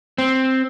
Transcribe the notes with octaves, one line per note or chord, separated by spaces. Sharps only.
C4